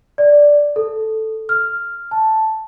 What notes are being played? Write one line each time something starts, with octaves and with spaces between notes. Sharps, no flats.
D5
A4
F6
A5